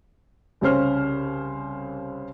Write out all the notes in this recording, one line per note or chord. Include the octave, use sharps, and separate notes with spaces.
C2 C#3 C#4 C5 F6